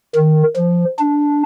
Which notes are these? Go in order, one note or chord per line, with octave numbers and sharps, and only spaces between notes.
D#3
F3
D4